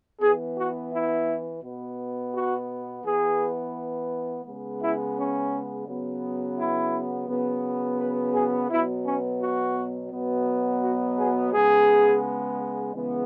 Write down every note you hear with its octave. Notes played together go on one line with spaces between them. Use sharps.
E3 B3 G#4
F#4
E4
B2 B3
F#4
E3 B3 G#4
C#3 G#3 B3
E4
C#4
C#3 F#3 B3
E4
C#3 F#3 B3
B4
G#4
B2 F#3 B3 E4
C#4
F#4
B2 F#3 B3
F#4
G#4
C#3 G#3 B3 G#4
C#3 E3 G#3 B3